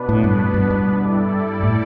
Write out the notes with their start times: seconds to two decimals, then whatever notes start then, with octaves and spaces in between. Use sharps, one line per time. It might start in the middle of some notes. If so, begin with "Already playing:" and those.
Already playing: B2 B3 D4 B4
0.09 A2
0.24 G2
0.54 G2
0.70 G2
1.00 G3 E4 A4 D5
1.63 A2